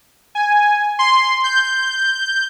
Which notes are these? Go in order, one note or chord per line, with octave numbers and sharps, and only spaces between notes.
G#5
C6
G6